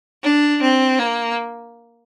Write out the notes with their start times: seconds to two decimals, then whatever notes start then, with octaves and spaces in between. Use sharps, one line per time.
0.23 D4
0.62 C4
0.99 A#3